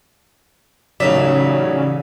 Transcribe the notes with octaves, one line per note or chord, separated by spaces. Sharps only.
A1 C#3 F#3 D#4 F#4 D5 E5